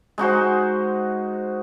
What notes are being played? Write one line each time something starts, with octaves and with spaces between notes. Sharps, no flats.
G#3 D#4 F#4 C5